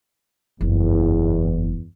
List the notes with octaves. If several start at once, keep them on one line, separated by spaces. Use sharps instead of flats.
F#1 E2 G2